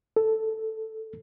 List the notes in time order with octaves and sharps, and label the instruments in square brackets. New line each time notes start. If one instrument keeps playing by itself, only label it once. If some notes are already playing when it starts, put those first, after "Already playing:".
[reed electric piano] A4